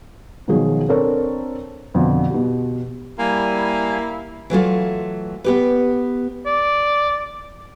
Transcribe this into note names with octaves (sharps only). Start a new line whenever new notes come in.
B2 D#3 F3 F#3 G#4
C4 D4 A4 A#4 C#5
F2 B2 D3 F3
B2 G4
G3 A#3 E4 G#5
E3 F#3 A3 F4
B3 G4 B4
D5